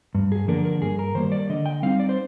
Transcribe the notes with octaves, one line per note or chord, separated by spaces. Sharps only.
G2
G#4
D3 F3 A#3 D4 A#4
A#4
G2 G#4
A#4
D#3 G3 A#3 C5
D5
D3 D#5
G5
G3 C4 D#4 F5
D5
C5